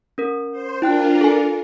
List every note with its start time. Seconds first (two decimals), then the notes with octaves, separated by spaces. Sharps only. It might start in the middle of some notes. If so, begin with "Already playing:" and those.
0.18 C#4 A#4
0.52 C5
0.82 D4 E4 F4 A#4 G5 F#6
1.21 A4 G#5